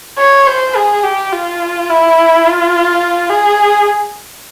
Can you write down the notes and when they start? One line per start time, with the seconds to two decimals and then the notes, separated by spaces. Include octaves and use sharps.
0.19 C#5
0.47 C5
0.76 G#4
1.04 G4
1.32 F4
1.90 E4
2.46 F4
3.30 G#4